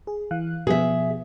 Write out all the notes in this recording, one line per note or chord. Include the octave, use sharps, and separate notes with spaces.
G#4
E3 F5 F#6
B2 F3 B3 G#4 E5